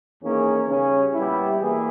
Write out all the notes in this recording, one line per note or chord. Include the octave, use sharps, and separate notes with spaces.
E2 D#3 A#3 C#4 G#4
C#3 G3 C#4
A#2 G3 B3 E4
E2 B2 A#3 E4 G#4